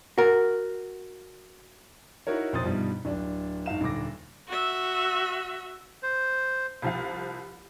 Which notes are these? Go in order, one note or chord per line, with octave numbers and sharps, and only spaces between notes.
F#4 A#4
D#4 E4 F#4 A#4 C#5
A#1 F2 C3 C5 D#6 A6
G2 B2 F3 G3 D#4
D1 D4
G#1 D#4 F5 E7
D#1 D3 D6 A#6
F#4 E5
C5
C2 F3 F5